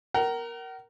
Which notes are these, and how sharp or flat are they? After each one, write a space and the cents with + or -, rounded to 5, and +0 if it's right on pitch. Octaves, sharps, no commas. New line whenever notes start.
A#4 +0 F#5 +45